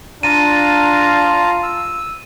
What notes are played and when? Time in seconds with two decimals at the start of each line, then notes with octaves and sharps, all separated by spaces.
0.23 D4 F4 A5 A#5 D#7
1.63 E6